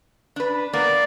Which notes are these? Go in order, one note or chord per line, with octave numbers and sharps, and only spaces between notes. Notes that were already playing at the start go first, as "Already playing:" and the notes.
D4 B4
A#3 B3 D5